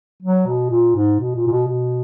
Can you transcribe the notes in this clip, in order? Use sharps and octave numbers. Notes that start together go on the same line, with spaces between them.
F#3
B2
A#2
G#2
B2
A#2
A#2
B2
B2